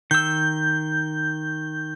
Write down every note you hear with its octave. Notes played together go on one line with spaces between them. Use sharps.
D#3 E6 G6